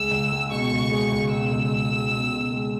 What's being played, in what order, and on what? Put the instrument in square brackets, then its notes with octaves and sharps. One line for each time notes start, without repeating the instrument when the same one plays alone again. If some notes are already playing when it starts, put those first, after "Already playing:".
Already playing: [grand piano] C#2 G#3 [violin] E6
[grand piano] C#2
G#3
[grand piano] B2 [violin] C#6
[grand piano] C#2
G#3
C#2
[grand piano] B2 [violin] E6
[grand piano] C#2
C#2
G#3
B2
B2
G#3